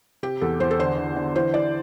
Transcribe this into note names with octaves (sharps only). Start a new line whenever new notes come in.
C3 G4
E2 A4
E2 C5
A4
D3 C5
D3
D3
E3 C5
E3 D5